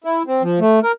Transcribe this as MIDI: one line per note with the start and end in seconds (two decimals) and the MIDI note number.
0.04 0.23 64
0.27 0.42 60
0.42 0.59 53
0.60 0.80 57
0.84 0.92 70